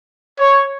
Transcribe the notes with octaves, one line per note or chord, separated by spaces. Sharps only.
C#5